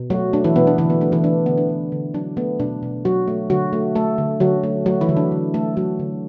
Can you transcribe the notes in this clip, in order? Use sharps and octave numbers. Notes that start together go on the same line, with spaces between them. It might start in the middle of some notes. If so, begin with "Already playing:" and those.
Already playing: B2
F#3 A3 F#4
A3 D4
E3 E4
B2 B3
D4
D3 E3 E4
B3
A3 D4
E3 E4
A3 D4
D3 B3
D4
D3
D3
F#3 D4
A3 B3
B2 D4
B2
F#3 F#4
A3
D3 F#3 F#4
A3
A3 A4
D3
D3 F#3 F#4
A3
F#3 A3 F#4
E3 E4
D3
D4
D3
A3 A4
F#3 A3 F#4
D3